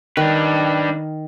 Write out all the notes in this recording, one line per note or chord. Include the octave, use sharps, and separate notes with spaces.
D#3 D4 B4